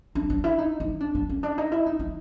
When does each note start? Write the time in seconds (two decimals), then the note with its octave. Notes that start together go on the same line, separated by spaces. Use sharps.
0.15 D4
0.30 D4
0.44 E4
0.58 D#4
0.80 D#4
1.01 D4
1.15 D4
1.30 C#4
1.43 D4
1.58 D#4
1.72 E4
1.86 D#4
1.99 D#4